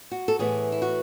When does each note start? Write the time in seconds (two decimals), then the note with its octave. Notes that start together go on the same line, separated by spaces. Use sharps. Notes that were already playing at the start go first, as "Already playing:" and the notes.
0.11 F#4
0.28 A4
0.39 A2 E3 B3 G#4
0.72 E4
0.82 F#4